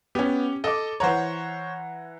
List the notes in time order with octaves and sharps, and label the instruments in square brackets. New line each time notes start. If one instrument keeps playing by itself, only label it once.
[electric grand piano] B3 [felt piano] C#4 G4
[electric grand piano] A4 D6 [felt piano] D#5
[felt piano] E3 F#5 A#5 [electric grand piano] C5 C#5